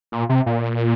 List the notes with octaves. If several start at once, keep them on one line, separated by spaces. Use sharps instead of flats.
A#2
C3
A#2